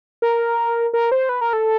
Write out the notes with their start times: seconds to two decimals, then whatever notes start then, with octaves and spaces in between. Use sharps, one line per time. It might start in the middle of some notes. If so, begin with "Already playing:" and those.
0.22 A#4
0.94 A#4
1.12 C5
1.29 B4
1.41 A#4
1.53 A4